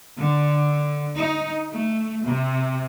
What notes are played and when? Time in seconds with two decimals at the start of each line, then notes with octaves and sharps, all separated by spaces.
0.18 D3
1.16 D#4
1.71 A3
2.25 C3